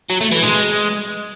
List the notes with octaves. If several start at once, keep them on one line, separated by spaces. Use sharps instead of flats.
F#3
A3
E3
G#3